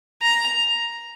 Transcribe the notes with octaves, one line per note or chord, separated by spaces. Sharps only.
A#5